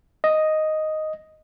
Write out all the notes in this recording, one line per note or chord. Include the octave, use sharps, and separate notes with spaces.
D#5